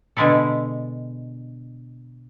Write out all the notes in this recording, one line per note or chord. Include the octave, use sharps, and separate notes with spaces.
B2 D3 G#3 E4 A4